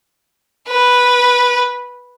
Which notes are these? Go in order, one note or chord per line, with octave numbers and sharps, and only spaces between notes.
B4